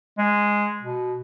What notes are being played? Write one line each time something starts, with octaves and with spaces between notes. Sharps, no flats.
G#3
B2